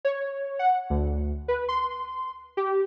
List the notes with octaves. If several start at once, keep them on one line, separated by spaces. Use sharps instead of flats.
C#5
F#5
D2
B4
C6
G4